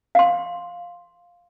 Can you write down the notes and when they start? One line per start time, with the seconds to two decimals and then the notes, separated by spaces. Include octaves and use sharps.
0.15 F5 C6